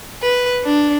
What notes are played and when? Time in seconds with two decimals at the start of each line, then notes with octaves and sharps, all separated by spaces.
0.22 B4
0.65 D4